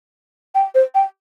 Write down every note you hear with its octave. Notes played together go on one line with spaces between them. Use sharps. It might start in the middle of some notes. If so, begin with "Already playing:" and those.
G5
C5
G5